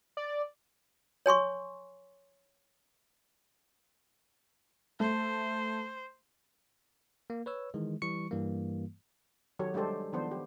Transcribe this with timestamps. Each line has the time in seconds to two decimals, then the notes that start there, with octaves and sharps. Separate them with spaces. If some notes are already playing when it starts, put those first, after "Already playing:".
0.17 D5
1.26 C#5 G#5 C6 C#6
5.00 A3 C5
7.30 A#3
7.46 B4 C#5 E6
7.74 D#3 E3 G#3
8.02 E3 G3 C#6 C#7
8.31 G2 E3 G3 A#3
9.59 D#3 F#3 F#4 G4 A4 C#5
9.74 G3 G#3 D4 G4 A4 C5
10.13 D#3 F3 B3 D4 C5
10.31 G4